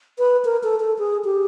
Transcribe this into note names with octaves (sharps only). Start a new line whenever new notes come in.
B4
A#4
A4
A4
G#4
G4